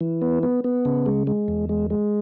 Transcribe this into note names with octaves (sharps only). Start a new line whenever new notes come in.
E3
B3
B3
B3
C#3
G#3
G#3
E2
G#3
G#3